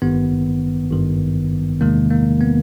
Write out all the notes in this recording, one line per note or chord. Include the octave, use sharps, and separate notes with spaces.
G#1 G2 D#3 B3
G#1 G2 D#3
E2 C3 D#3 G#3 A#3
A#3
B3